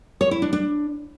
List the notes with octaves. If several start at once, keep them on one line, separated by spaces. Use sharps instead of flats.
C#5
E4
D4
D4